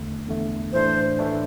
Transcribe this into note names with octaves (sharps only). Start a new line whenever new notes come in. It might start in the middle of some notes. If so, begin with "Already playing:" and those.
Already playing: E2 D3 A3
E2 D3 A3
A2 E3 A3 D4 C5
A2 E3 A3 D4